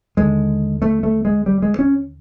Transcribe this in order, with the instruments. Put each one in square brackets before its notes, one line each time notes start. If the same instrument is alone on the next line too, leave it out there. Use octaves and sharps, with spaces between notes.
[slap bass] D#2 D3 G#3
A3
A3
G#3
G3
G#3
C#4